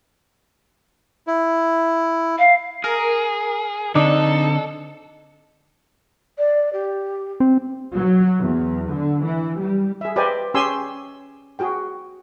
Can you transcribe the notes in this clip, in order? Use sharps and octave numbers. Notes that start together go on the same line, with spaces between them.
E4
F5
G#4 A#4
D3 C4 D4 D#4 A4
D5
G4
C4
F#3
E2
D3
E3
G3
G#4 E5
G4 B4 C5 D5 D#5 G#5
C#4 G4 G#4 G#5 C6 E6
F#4 G#4 G5